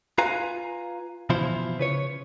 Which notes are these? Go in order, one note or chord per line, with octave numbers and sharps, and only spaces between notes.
F4 B4 F5 G#5 A#5
B2 E3 F3 E4 F4 C5
C#3 B4 C#5